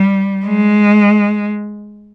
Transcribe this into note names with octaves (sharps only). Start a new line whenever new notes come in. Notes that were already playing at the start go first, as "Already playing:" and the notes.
Already playing: G3
G#3